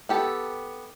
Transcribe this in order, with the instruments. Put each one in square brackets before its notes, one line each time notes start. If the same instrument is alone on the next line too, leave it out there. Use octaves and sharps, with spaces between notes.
[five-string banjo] B3 G4 A4